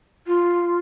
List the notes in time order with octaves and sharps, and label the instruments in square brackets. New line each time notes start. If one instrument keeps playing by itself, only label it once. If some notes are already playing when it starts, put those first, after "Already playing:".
[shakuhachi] F4